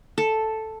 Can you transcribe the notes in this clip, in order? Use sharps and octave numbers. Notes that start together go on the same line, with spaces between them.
A4